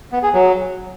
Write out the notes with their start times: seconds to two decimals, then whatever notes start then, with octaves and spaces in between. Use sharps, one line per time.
0.12 B3
0.23 G#4
0.33 F#3